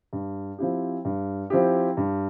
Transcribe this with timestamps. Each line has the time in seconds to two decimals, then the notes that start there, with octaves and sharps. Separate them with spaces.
0.13 G2
0.58 F3 C4 E4 G4
1.05 G2
1.50 F3 C4 E4 G4
1.97 G2